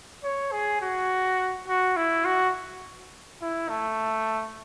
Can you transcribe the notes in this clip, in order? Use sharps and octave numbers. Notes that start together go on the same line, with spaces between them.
C#5
G#4
F#4
F#4
E4
F#4
E4
A3